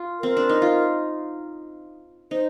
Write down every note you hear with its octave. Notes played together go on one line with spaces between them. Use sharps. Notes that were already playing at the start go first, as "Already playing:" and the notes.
Already playing: F4
C4 A#4
D4
D#4
F4
D#4 C5